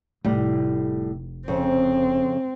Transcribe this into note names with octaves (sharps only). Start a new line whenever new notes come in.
F1 A2 G3
F2 C#3 C4